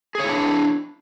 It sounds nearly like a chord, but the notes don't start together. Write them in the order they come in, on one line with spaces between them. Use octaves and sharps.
G#4 C#5 E4 D4